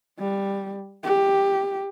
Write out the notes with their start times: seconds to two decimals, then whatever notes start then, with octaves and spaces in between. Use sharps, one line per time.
0.19 G3
1.04 G4